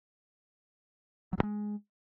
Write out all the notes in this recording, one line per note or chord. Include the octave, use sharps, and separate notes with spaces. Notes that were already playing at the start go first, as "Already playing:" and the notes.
F#3
G2
G#3